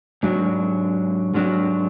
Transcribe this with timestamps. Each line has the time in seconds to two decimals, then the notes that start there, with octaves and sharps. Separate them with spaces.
0.23 G#2 F#3 D4
1.34 G#2 F#3 D4